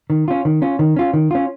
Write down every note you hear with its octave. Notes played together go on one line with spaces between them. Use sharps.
D#3
C#4 F4
D#3
C#4 F4
D#3
C#4 F4
D#3
C#4 F4